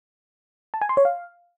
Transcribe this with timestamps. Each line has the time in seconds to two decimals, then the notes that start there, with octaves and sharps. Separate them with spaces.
0.74 A5
0.82 G#5
0.89 C6
0.97 C#5
1.05 F5